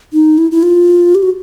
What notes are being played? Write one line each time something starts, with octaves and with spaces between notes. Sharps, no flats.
D#4
E4
E4
F4
G4
F#4